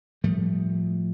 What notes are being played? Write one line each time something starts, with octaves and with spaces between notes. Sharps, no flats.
A2 F3 G3 A3